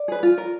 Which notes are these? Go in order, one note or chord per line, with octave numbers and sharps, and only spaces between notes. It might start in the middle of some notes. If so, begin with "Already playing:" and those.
Already playing: D5
G#4 B4
F4
A#4